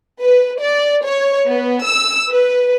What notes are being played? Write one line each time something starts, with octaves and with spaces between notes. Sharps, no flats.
B4
D5
C#5
B3
E6
B4